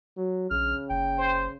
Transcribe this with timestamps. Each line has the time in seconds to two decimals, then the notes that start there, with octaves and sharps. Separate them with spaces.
0.17 F#3
0.51 A#1 C#3 F6
0.90 F#1 G5
1.18 C5